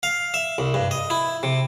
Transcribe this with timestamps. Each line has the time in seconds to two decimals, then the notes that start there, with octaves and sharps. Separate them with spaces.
0.03 F5
0.34 E5
0.58 C2
0.74 G2
0.91 D#5
1.10 E4
1.43 C3